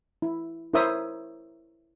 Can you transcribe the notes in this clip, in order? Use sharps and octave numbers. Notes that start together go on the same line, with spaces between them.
E4
E4 A#4 C5 C#5 E5 D#6